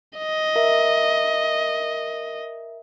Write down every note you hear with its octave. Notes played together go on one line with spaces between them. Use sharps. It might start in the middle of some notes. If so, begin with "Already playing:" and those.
D#5
A#4 E5